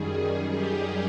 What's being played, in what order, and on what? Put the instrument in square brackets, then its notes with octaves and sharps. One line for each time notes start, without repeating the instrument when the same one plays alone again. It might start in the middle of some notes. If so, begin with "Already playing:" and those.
Already playing: [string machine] F#2 D#3 G3 G#4
G4